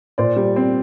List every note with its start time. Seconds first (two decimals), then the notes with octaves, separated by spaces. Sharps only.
0.18 A#2 C5 D5
0.36 G3
0.56 C4